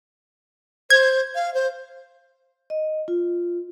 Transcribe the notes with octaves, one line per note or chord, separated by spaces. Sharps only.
C5 G#6
F5
C5
D#5
F4